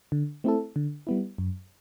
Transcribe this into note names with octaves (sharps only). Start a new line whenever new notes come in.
D3
A3 C4 E4 A4
D3
G3 B3 E4
F#2